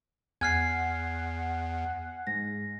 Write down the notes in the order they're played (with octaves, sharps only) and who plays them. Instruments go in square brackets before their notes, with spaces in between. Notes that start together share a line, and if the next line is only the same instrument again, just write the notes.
[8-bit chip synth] E2 [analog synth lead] F#5 [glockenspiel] G#5 F6 C7 [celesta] G#6
[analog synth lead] G#2 [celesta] A#6